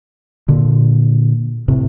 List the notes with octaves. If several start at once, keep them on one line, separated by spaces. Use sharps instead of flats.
A#2 D3
A2 C3